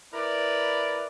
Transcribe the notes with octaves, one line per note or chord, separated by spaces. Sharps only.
E4 A#4 B4 D5